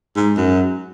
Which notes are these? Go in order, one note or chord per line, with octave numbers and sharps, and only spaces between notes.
G#2
F#2